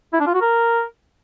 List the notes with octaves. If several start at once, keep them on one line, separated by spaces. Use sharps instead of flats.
E4
D4
F4
F#4
A#4